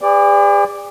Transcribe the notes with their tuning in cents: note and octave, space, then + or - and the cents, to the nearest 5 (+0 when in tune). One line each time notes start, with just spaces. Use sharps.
G#4 -45 B4 +40 D5 +0